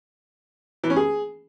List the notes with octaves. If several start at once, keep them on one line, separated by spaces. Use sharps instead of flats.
E3
C#4
G#4